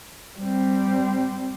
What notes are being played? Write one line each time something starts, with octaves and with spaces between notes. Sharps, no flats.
G3 C4